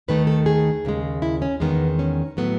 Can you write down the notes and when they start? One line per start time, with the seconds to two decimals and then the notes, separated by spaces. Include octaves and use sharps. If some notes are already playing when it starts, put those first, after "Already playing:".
0.08 D#2 D#3 A3 B4
0.27 A4
0.46 G#4
0.85 D#2 C#3 G#3
1.22 E4
1.42 C#4
1.60 E2 D#3 G#3 B3
1.99 C#4
2.37 A2 F#3 A3 B3